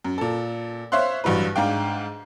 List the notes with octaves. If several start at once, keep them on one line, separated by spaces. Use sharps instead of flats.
F#2
A#2 A4
C5 C#5 E5 F5 C6 F#6
A1 G2 F#3 B4
G#2 D4 F5 G5